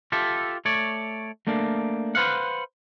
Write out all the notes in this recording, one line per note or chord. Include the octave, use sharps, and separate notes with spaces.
F4 G4 A4 E5
A3 C#5 D5
A3 A#3 D4
B4 C5 F5 F#5